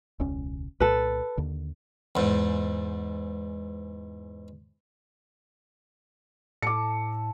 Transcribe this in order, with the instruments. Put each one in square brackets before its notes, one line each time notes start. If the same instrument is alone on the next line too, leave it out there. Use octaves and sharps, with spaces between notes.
[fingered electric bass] E1 C#2 C#4
[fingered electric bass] C2 A#2 [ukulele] A4 B4
[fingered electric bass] D#2 D3
[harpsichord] E2 G#2
[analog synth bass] A2 [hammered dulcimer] A4 [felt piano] D6 C#7